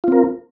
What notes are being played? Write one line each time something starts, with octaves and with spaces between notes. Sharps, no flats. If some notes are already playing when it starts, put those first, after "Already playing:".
C4 F4 A#4